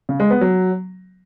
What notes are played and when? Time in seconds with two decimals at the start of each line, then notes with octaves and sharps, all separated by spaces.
0.09 C#3
0.20 G#3
0.30 B3
0.41 F#3